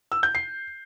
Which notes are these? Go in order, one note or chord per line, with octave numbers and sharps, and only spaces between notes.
E6
G6
C7